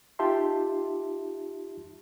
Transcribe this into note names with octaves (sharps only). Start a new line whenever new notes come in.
D#4 F4 G4 E5 A5 C6